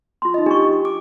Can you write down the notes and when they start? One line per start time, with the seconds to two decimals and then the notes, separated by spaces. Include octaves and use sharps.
0.22 F4 C6
0.34 D#4 D#5
0.46 D4 G4 D#5 C#6
0.85 D6